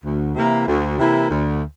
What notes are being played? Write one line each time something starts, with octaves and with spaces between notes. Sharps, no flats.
D2
C3 E3 A#3 E4
D2
C3 E3 A#3 E4
D2